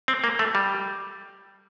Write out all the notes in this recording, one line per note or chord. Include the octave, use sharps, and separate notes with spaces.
C4
A#3
A3
G3